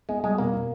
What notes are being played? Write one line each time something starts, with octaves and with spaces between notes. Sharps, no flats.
G#3 B3
G3 G#3
B2 A#3
B3